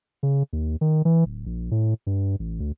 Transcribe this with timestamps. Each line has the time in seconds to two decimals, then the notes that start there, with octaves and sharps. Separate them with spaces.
0.23 C#3
0.53 D#2
0.81 D#3
1.05 E3
1.26 D1
1.46 A#1
1.71 A2
2.07 G2
2.39 A1
2.60 D2